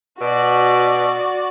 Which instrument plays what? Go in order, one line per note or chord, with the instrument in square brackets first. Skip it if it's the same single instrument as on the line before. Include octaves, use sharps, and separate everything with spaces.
[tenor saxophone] B2 [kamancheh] F#4 D5